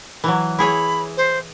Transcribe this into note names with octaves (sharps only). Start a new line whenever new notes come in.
E3 F#3
E4 G#4 C#5 B5
C5